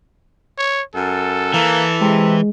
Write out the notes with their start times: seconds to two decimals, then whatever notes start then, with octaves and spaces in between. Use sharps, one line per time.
0.58 C#5
0.95 F#2 A4
1.54 E3 A#3
2.01 C3 G#3